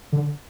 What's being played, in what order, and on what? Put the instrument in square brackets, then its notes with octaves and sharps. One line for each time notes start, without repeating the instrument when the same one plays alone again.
[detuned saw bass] D3